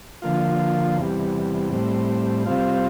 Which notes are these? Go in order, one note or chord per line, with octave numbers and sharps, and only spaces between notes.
D3 F3 A#3 F4
E2 C3 G3
A2 G3 C4
C3 G3 C4 F4